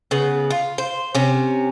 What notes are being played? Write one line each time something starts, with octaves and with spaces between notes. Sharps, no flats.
C#3 B3
F4
C5
C3 C#4